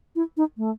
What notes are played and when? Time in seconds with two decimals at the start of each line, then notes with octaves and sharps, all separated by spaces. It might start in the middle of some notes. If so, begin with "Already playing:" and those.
0.16 E4
0.37 D#4
0.58 A3